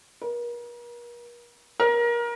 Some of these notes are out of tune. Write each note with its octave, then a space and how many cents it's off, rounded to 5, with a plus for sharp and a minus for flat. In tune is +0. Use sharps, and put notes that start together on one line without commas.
A#4 +40
A#4 +25